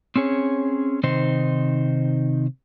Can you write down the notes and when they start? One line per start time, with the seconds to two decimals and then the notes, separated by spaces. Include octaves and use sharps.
0.16 C4 C#4 G#4 C#5
1.03 C3 D#3 C4 D#4 C5